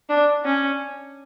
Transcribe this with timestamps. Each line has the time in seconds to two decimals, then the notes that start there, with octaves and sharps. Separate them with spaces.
0.09 D4
0.45 C#4